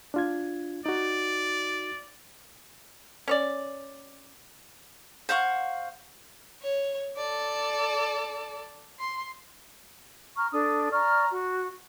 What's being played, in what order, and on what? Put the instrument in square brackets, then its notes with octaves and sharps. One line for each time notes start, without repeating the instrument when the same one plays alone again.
[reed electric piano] D4 F4 G#6
[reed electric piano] D#4 F#4 [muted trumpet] D5
[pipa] C#4 C#5 D5
[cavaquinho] C5 F5 F#5 C#6
[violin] C#5
A4 D5
C6
[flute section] A#5 C#6 F6
D4 A4 D5 D#6
D5 A#5 C#6 F6
F#4